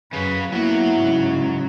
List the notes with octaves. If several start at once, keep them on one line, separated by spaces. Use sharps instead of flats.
F#2 C#3 B4
F#3 A#3 B3 E4 F#5
G#2 C#3